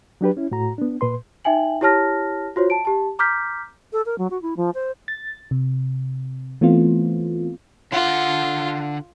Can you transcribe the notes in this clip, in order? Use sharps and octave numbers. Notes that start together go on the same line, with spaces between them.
F#3 D4 G4 B4
C#4 E4
A2 F#4 A#5
B3 D4
A#2 B4 C6
D#4 E5 G5 G#5 F#7
E4 G4 C#5 A5 F6 A#6
F4 F#4 C5 C#5
A5 D7
G4 A5
A#5 D6 F6 G6 B6
A4
A#4
F#3
F#4
E4
F3
C5
A6
C3
E3 A3 B3 C4 F4
D3 F4 F#5